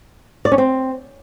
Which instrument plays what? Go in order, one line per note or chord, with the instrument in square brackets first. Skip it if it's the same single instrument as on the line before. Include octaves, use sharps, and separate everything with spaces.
[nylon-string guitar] D5
C#4
C4